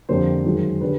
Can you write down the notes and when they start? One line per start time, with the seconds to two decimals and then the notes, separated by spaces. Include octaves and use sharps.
0.09 F2 D3 G3 A#3 C5
0.45 F#2 D#3 G#3
0.81 D3 G3 B4